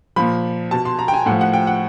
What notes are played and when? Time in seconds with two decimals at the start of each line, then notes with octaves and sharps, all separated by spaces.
0.16 A#2 F3 B5
0.71 B2 A5
0.85 C6
0.99 A#5
1.08 G5
1.13 G#5
1.26 A2 F3 F#5
1.41 F#5
1.53 G5
1.67 F#5